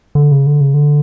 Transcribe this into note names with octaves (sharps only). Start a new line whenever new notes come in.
D3
C#3
D3
C#3
D3